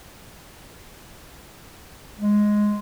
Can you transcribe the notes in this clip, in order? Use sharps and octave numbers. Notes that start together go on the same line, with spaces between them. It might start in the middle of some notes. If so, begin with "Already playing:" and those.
G#3